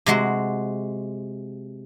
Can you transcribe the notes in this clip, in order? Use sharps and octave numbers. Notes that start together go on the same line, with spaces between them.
C3 G#3 F#4